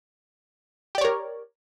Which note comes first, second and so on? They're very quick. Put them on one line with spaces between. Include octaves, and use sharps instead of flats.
G4 D5 C#5 A#4